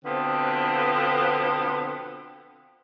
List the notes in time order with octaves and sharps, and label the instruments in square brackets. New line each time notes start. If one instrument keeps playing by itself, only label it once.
[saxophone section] B2 D3 F3 B3 C4 B4